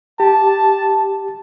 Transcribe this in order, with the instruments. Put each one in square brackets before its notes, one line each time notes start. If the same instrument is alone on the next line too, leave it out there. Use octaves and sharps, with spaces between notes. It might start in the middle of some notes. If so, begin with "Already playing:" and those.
[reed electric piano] G4 [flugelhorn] A5